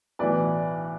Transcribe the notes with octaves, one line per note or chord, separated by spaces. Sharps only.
B1 A2 E3 B4 D5